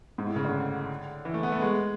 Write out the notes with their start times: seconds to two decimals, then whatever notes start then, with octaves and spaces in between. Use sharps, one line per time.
0.18 G#2
0.27 A2
0.36 C#3
0.45 D3
1.25 E3
1.34 A3
1.43 B3
1.52 A3
1.62 G#3